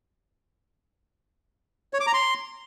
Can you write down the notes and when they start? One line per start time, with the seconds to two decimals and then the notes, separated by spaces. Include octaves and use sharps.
1.94 C#5
2.00 D6
2.07 A#5
2.14 C6